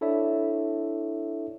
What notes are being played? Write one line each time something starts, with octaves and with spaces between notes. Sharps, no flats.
D4 E4 A4 C#5 D5 E5